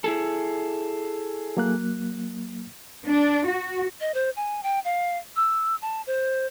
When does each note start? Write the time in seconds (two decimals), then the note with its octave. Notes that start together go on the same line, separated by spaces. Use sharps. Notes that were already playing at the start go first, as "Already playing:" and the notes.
0.04 E4 G#4 A4
1.57 F#3 A#3 F#6
3.06 D4
3.46 F#4
4.01 D#5
4.14 C5
4.36 G#5
4.63 G5
4.85 F5
5.36 E6
5.82 A5
6.07 C5